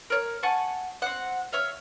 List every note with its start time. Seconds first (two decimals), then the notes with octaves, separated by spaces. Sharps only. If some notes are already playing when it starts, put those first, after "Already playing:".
0.10 A#4 C#5
0.43 F#5 G#5 A5 C#6
1.02 C4 F#5
1.52 C#5 E5 F5